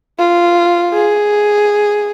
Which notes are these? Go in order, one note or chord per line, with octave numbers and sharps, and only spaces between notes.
F4
G#4